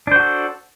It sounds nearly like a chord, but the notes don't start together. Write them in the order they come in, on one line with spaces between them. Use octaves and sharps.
D4 C5 F#4 A4